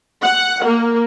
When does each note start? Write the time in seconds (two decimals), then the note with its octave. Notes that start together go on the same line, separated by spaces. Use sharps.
0.22 F#5
0.64 A#3